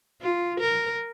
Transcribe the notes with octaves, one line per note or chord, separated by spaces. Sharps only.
F4
A#4